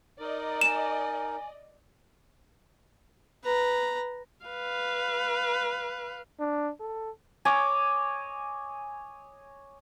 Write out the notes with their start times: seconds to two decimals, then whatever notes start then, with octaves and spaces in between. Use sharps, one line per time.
0.20 D#4 A#4 D5 D#5
0.61 G#5 E7
3.44 B4 A#5
4.46 B4 F5
6.39 D4
6.80 A4
7.45 C#5 D#5 G#5 D6